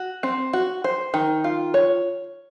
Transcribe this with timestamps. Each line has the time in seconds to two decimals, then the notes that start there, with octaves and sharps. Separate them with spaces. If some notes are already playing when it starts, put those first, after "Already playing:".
Already playing: F#4
0.23 C4
0.53 F#4
0.84 C5
1.14 D#3
1.44 F4
1.74 C#5